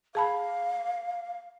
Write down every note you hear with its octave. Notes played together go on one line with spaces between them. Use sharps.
G#4 F5 A5 B5